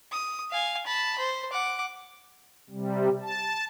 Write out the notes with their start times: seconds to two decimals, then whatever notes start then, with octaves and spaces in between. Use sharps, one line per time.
0.12 D#6
0.51 F5 G#5
0.86 A5 B5
1.18 C5
1.52 F#5 D6
2.70 C3 G3
3.22 A5